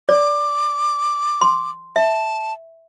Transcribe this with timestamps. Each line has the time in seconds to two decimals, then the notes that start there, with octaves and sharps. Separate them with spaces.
0.09 D5 D6
1.41 C6
1.96 E5 A5